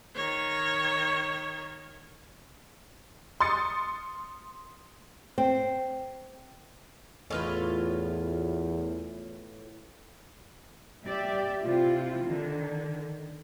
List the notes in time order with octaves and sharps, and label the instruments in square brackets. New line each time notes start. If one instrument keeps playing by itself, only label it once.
[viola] D#3 C#5
[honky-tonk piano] C6 D#6 A6 C#7
[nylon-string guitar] C4
[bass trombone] E2 [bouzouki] A2 F4 B4
[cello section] G3 G4 D5 E5
C3 E4 F4
D3 D#3